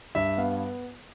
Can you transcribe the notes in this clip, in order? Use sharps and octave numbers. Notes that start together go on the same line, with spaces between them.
G2 E5
B3 F5